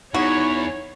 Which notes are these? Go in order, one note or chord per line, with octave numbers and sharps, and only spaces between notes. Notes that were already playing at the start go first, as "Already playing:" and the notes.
E2 D#4 F#4 C#5